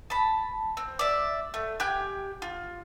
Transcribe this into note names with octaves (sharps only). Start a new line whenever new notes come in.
A5 B5
C4
D5 E5
A3
G4 G5 G#5 F#6
F4